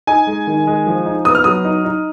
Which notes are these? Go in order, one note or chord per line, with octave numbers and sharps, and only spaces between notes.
D#4 G#5
G#3
D#3
G#3
F3
D#4
B3 D#6
F6
F#3 D#6
D#4
D#4